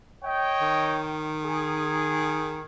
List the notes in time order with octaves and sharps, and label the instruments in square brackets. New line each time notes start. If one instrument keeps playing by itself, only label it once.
[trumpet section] C#5 D#5 G5
[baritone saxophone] D#3
[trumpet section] G#4